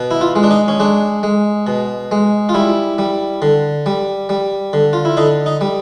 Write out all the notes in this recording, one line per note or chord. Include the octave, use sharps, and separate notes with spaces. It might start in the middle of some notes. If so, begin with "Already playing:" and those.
Already playing: B2
E4
F4
G#3
D4
D#4
C#4
G#3 D4
G#3
B2
G#3
F4
G3 E4
G3
D3
G3
G3
D3
F4
E4
D3 D#4
D#4
G3